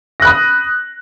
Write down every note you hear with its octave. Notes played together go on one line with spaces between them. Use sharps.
B5 D#6 F#6 A#6